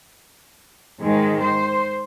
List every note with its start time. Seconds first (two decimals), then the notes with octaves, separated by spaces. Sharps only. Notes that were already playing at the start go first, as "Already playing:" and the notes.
0.99 G#2 D#3 G#3
1.41 C5